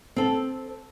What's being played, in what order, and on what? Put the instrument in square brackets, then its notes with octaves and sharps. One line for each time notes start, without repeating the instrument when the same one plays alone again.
[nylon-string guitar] C4 A4